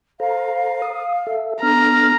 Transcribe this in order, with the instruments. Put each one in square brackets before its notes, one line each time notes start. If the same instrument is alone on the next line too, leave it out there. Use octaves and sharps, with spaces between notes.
[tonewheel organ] A4 C5 A#5 [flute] F5
[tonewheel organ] D#6
A4 E5
[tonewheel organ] B3 D4 A4 [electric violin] A#5 [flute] F6